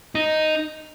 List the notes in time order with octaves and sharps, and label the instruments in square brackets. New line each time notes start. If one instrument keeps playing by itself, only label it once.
[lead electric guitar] D#4